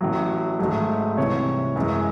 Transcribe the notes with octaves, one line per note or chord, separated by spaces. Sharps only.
A1 A2 F#3
G#1 G#2 F#3 A3
C2 C3 E3 C#5
F#2 E3 G#3